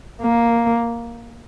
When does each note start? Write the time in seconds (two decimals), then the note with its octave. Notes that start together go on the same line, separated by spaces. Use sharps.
0.22 A#3